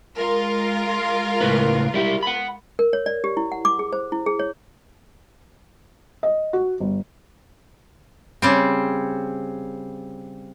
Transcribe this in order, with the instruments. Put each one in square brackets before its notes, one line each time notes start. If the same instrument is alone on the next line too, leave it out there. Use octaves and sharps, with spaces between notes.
[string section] G#3 F4 A#4
[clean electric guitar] C#2 A2 B4
G3 E4 G4
F#5 B5
[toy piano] A#4
C#5
D5
G4
E4
F#5
D6
G#4
C5
E4
G#4
C#5
[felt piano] D#5
F#4
G1
[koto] C#3 G3 C4